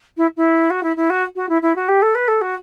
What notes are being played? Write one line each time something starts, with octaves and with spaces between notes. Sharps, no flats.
E4
E4
F#4
E4
E4
F#4
F#4
E4
E4
F#4
G4
A4
B4
A4
F#4